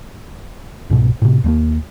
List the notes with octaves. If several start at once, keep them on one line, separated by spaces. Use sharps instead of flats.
C2 G#2 B2
A2 C3
D#2 G3 A#3